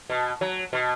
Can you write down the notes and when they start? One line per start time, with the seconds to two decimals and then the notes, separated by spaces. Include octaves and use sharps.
0.10 B2
0.41 F#3
0.73 B2